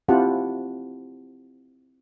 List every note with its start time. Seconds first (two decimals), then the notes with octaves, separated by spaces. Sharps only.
0.08 C4 E4 F4 G4 F#5 A5